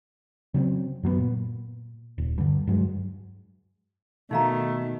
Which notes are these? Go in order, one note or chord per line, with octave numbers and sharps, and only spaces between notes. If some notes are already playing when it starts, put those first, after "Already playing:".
C#3 F#3 G3 C4
F#2 F#3 G3 B3
A#2
D#1
G2 D3
G2 F#3 G#3
B2 D#3 A3 B3 D#4 F#4 F5 A#5